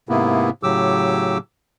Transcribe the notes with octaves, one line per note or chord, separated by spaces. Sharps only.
G#2 C3 A#3 B3 E4
A2 C#3 F#3 G4 D6 E6